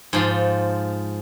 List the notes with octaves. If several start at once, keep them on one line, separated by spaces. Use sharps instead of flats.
G#2 F3 C6